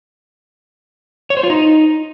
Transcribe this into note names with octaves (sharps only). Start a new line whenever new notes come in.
C#5
C5
F4
D#4